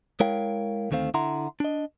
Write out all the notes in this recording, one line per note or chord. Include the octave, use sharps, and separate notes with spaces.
G#3 E4 A#4 C#5 F5 G5
D2 D#3 A3 C4 F5
D3 E4 E5 F#5 A#5 C6
D4 D#5